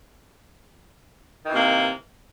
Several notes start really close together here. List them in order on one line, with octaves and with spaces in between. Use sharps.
D#3 E3 C3 A#3